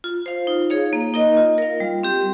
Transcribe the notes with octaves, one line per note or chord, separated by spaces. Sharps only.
F4
C5 F5
D#4
G#4 C#5 F5
A#3
D#4 A#4 D#5
F4
A#4 F5
G3
C4 G4